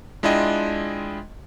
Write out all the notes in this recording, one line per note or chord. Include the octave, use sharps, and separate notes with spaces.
G#3 D4 E4 F4 D#5 G5